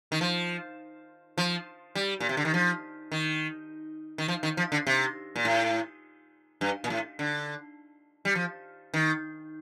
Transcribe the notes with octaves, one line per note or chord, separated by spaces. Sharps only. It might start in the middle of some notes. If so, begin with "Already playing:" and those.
D#3
F3
F3
G3
A#2
C3
D3
D#3
F3
D#3
D#3
F3
D#3
F3
D3
C3
A#2
A2
G2
A#2
A2
D3
G3
F3
D#3